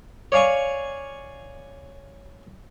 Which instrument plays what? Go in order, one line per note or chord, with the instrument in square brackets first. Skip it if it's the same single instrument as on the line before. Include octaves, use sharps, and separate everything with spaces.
[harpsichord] C#5 D5 F5 G#5 C#6